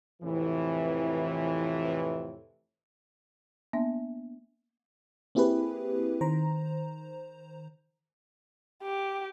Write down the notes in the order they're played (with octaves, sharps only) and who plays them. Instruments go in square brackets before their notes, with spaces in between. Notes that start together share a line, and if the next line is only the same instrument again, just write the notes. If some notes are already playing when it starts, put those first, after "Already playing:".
[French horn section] F2 A2 C3 E3
[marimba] A#3 B3 D4 E5
[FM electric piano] A#3 C4 E4 G4 G#4 B4
D#3 C5 A#5
[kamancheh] G4